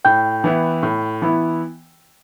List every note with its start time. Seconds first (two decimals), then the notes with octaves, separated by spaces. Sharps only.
0.05 A2 G5 G6
0.44 E3 B3 E4
0.83 A2
1.22 E3 B3 E4